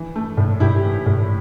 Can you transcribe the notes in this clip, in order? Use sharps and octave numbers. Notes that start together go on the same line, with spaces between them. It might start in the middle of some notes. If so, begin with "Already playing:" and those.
Already playing: E3
A3
A2
A2 E4 G4
E3
A2